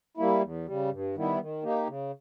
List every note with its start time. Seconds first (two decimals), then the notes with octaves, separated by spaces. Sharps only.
0.17 G3 A#3 E4
0.42 E2
0.66 C#3 G3
0.91 G2
1.16 D#3 G3 B3 E4
1.40 D#3
1.63 A#3 D#4 G4
1.87 C#3